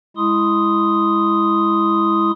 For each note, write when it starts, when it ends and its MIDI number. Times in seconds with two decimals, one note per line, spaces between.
0.17 2.31 56
0.17 2.31 64
0.17 2.31 84
0.17 2.31 87